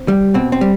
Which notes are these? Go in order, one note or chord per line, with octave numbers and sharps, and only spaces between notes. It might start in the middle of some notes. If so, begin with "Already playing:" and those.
Already playing: C4
G3
B2 C4
C4
G3